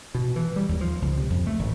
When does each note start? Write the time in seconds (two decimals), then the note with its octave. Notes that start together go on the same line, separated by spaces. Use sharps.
0.15 B2
0.36 E3
0.56 G3
0.69 D#2
0.81 F3
1.02 C#2
1.18 C3
1.30 F2
1.47 A3
1.59 G#1